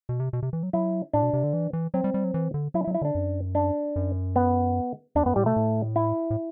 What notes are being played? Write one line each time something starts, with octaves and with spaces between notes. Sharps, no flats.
B2
C3
B2
C3
E3
F#3
F#3 E4
A2 D4
B2
C3
D3
E3
E3
F#3 C4
G3
G3
F#3
E3
D3
F#3 E4
E4
F#3
E4
D3 D4
F#2
D4
F#2
B3
E2 D4
F#2 B3
A2 G3
B2 A3
A2
E4
A2